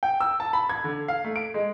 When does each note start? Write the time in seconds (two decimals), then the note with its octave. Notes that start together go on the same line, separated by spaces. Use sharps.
0.03 G5
0.20 E6
0.40 A5
0.53 B5
0.70 G#6
0.84 D3
1.08 F5
1.24 A3
1.36 D7
1.54 G#3